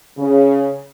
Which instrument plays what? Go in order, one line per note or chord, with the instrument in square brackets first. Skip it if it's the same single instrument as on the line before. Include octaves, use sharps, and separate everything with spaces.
[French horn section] C#3